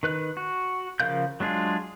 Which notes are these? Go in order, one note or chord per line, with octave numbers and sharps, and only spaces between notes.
D#3 B4 F#6
F#4
C#3 F3 A#4 F5 G6
F#3 G#3 D4 F4 G#4